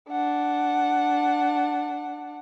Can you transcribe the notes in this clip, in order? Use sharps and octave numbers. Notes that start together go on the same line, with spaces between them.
D4 F#5